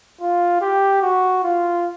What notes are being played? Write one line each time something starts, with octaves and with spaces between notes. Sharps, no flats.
F4
G4
F#4
F4